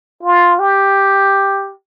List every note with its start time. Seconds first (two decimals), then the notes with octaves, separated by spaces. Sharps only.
0.23 F4
0.59 G4